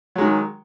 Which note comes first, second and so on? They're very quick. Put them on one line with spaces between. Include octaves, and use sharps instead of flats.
F#3 G#3 D#3